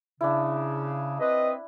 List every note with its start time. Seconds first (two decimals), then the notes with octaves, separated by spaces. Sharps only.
0.21 C#3 D4 E4
1.20 C4 B4 D#5